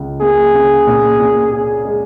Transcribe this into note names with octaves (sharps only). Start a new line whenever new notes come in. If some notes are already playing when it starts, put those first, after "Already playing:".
Already playing: C#2
A#3 G#4
C#3
A#2
A#2
C#4 G#4
G#3